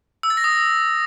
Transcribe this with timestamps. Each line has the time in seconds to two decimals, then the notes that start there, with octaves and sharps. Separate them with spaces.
0.23 E6
0.30 A6
0.37 A#6
0.44 D#6